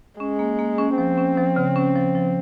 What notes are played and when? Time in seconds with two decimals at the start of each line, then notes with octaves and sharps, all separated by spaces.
0.20 G#3 C#4
0.39 A#3
0.59 A#3
0.78 C#4
0.97 F3 C4
1.18 C#4
1.37 F3
1.56 C#3
1.76 C#4
1.96 F3
2.15 F3